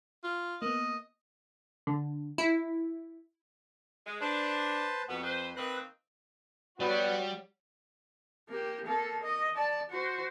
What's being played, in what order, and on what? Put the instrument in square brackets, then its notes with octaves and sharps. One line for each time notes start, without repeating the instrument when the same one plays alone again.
[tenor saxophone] F4
[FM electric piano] A#3 B3 [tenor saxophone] D#5
[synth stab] D3
E4
[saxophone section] G#3
[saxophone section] D4 [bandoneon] B4 C5 A5
[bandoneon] F2 [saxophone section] B2 B3
[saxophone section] B4 C5
[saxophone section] D#3 A#3 C4 [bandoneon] B4 F#6
[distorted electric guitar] G3 [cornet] B3 [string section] F#4 C#5 [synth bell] D5
[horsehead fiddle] A#3 G4
A#3 A4
D#5
D5 A5
F#4 C5